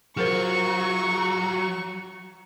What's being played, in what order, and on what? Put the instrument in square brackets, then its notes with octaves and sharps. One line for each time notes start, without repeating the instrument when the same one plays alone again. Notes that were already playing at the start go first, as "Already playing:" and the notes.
[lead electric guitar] F#3 [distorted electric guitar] F4 F#4 [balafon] G#4 A#4 C5 [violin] C#6